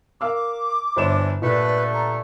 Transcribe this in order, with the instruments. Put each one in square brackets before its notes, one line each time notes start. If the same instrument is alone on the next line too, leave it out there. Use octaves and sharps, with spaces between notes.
[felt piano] A#4 F5 E6 [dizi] D6
[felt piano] G1 C5 E7 [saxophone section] E3 D4
[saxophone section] G2 D3 A3 [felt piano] A#2 [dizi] B4
[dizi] A#5